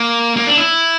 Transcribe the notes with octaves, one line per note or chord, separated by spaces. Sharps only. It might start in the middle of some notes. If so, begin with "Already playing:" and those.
Already playing: A#3
A#3
D4
E4